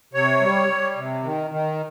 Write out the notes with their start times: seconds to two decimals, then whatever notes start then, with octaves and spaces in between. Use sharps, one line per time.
0.13 C3 C#5
0.40 G3
0.68 G3
0.96 C3
1.23 D#3
1.51 D#3